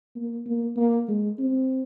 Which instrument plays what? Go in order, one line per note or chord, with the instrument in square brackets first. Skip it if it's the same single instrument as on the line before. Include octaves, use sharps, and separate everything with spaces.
[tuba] A#3
A#3
A#3
G#3
C4